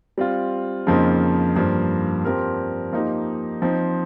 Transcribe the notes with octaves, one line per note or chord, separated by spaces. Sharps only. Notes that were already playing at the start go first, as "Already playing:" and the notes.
G3 C4 F4
F2 C#3 F3 A#3 D#4
G2 F3 A#3
F3 C4 G4 A#4
F3 A#3 D#4 G4
F3 C4 D#4